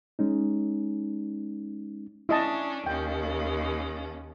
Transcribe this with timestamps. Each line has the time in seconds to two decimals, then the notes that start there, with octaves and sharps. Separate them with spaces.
0.19 G#3 C#4 D#4
2.29 C#4 D4 E4 D#5 A5
2.86 D#2 C#4 G5